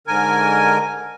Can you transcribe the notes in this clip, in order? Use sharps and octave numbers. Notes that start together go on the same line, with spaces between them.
G#2 D3 A#4 G#5